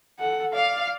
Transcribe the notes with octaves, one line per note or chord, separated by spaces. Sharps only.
A4 F#5
D5 F5